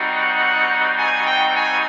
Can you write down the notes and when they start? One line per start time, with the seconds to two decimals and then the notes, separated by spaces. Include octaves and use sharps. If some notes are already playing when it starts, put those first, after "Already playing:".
Already playing: G3 C4 D#4 F#4
0.13 F#5
0.98 G#5
1.27 G5
1.55 G#5